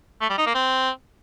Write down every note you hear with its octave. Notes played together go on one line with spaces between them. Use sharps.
A3
G3
D#4
A#3
C4